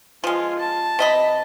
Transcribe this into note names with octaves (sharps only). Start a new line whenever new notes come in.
F3 G#3 F4
A5
C3 D#5 B5